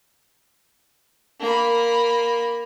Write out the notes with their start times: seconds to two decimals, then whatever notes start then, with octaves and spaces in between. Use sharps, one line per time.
1.40 A#3 B5